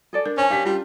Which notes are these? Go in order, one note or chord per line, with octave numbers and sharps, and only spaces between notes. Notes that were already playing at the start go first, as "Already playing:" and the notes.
G#4 A4 D5
D4 A#4
C#4 C5 C#5 G#5 A5
D4 G4 F5 B6
G3 C#4 F4